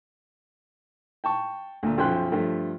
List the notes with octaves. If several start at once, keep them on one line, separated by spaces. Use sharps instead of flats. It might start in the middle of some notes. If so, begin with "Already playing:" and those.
G5 A5 C#6
D2 A#2
B1 F#2 F3 G5 C6 F#6
G2 F3 A3